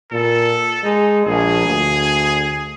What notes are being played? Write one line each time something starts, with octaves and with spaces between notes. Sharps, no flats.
A#2 A4
G#3 D#4
A#1 G#4
D2